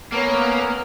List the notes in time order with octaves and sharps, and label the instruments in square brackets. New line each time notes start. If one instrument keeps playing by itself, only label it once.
[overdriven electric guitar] A#3 [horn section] B3 C#4 [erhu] A#4 [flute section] C#5 E6